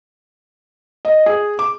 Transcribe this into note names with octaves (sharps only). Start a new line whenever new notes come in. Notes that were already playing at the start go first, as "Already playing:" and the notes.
D#5
G#4
D6